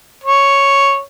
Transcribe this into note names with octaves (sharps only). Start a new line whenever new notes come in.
C#5